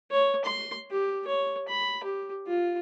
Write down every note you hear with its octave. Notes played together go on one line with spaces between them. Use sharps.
C#5
C6
G4
C#5
B5
G4
F4